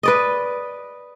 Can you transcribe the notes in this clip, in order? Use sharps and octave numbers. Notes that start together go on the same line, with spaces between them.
B4 D5 D#5